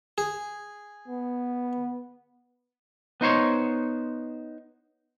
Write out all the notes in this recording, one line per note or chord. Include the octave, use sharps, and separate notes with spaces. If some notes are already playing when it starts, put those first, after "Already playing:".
G#4
B3
B3 D#4 C5 C#5